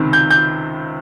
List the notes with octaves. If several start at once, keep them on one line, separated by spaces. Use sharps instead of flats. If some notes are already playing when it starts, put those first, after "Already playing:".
Already playing: C#2 C3 D#3
G6
G6